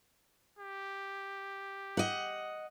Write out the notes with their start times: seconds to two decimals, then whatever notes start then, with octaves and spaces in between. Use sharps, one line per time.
0.59 G4
1.97 D#5 F#5